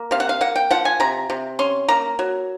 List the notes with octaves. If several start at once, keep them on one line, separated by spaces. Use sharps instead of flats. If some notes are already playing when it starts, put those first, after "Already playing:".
Already playing: A#3
C3 F5
F#5
F5
A#3 F#5
G5
F3 F#5
G#5
C3 A#5
C3
C#4 C6
A#3 A#5
F#3